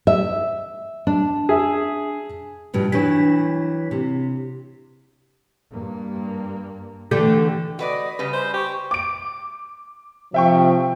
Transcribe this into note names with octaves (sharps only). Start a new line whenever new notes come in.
E5
D4
G#4 E5
G2 B2 F3
E3 F#3 D4 B6
C3
G2 A#3
D3 E3 A3 G4
F#4 B4 D5 D#5
C#3 G3 B4
C5 C6
G4 C#6
D6 D7
C3 F3 E5 G5 C#6